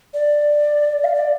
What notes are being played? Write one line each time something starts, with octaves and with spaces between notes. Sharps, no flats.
D5
F5
D5